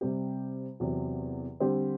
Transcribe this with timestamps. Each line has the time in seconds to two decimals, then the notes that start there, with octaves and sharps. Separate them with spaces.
0.01 C3 G3 C4 G4
0.80 E2 C3 F#3
1.60 D3 G3 C4 G4 C5